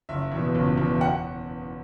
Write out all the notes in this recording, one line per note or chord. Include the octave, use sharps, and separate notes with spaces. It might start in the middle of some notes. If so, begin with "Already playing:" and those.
F#1 E5
E2 B2
F#1
E2 B2
F#5